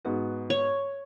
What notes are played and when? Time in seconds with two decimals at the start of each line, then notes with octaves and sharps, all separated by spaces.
0.05 G#2 B3 F#4
0.50 C#5